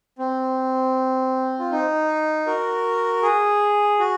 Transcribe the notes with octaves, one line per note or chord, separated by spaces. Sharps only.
C4
F4
D#4
F#4 A#4
G#4
F#4